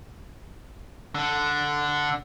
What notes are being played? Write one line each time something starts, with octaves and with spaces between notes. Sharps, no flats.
D3